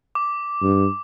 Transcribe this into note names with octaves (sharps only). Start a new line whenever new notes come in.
D6
G2